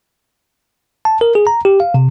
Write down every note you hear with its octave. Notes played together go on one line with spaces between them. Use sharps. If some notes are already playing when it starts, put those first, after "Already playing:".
A5
A#4
G#4
A#5
G4
F5
C3